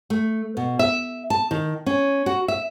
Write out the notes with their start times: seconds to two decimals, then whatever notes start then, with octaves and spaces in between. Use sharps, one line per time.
0.10 A3
0.57 B2
0.79 E5
1.30 A5
1.51 D#3
1.86 C#4
2.26 F#4
2.48 E5